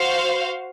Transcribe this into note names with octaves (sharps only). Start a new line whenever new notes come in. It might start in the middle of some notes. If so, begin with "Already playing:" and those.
Already playing: F#4 C5 F5